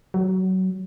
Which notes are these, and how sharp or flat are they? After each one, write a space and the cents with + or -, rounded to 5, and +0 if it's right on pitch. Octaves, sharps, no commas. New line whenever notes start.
F#3 +20